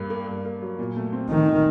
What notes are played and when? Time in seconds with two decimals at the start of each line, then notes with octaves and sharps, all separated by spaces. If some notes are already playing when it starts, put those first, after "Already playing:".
Already playing: G2 A#3
0.10 A#3
0.27 G2
0.45 A#3
0.62 F#3
0.79 A#2
0.96 A3
1.13 C4
1.30 D#3 A3
1.47 A#2